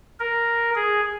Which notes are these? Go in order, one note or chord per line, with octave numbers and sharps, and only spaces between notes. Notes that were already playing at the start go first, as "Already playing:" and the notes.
A#4
G#4